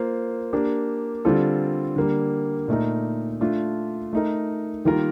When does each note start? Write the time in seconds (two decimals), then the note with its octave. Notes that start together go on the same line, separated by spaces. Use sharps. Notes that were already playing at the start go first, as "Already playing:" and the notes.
Already playing: A#3 F4 C5
0.53 A#3 D4 G4
1.25 D3 G3 C4 F4 A4
1.96 D3 G3 A#3
2.68 A#2 A3 D#4 A#4
3.41 A3 D4 F4
4.13 A3 D#4 A#4
4.85 D#3 G3 A#3 F4 A#4